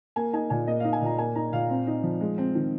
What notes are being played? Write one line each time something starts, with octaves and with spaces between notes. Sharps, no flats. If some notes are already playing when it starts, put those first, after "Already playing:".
A#3 G#5
D#4 G#5
A#2 G#5
A#3 D#5
D#4 F5
G#5
A#2 A#5
A#3 G#5
D#4 A#5
A#2 F5
C4
D#4
F3
G#3
C4
D#3